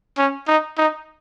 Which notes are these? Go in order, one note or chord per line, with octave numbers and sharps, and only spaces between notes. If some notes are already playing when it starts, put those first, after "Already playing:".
C#4
D#4
D#4